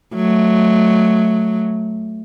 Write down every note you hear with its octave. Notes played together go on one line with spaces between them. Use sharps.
F#3 A3